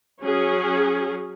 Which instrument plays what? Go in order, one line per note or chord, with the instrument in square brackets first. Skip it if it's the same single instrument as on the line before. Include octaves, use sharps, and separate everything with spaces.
[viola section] F#3 C#4 G#4